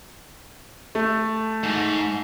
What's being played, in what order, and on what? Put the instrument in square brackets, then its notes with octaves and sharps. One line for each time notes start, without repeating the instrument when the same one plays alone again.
[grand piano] A3
[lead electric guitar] G#2